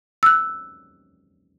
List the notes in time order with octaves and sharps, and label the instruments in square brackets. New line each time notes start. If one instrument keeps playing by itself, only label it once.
[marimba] E6 F#6